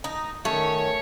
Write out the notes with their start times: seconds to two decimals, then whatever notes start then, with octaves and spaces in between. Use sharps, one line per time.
0.04 D#4
0.45 D#3 A3 C#4 C#5